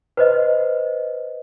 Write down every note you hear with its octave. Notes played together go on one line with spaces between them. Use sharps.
B4 C5 D#5